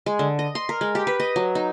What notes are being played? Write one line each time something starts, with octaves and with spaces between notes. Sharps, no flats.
G#3
D3
D#5
C6
A#4
G#3
G4
B4
D#5
F#3
D#4